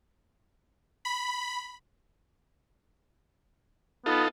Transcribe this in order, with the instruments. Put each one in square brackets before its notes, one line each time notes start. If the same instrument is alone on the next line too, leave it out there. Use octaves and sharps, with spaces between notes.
[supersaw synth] B5
[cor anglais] B3 [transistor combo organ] D#4 F4 A4